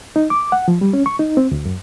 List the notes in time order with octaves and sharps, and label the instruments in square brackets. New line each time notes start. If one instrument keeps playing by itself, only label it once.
[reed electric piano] D#4
D6
F#5
F3
G3
C#4
C#6
D#4
C4
D2
F#2